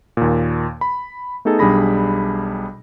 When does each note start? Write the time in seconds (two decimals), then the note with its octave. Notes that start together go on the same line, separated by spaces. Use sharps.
0.17 D#2 A#2
0.81 B5
1.45 A3 B3 D#4 G#4 A4
1.59 B1 G3 D4 G#4 B5 A#6